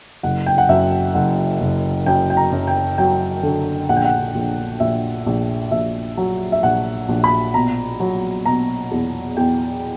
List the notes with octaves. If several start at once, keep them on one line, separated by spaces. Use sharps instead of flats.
F#1 F#5
G5
F#5
F#2 E5
F#1 F#5
F#1
F#2 G5
G5
A#5
F#2
G5
F#3 G5
D3
A#1 F#5
G5
F#5
A#1
A#1 E5
A#1
A#1 E5
F#3
E5
A#1 F#5
A#1
B5
B2 A#5
F#3
B2 A#5
E2
E2 G5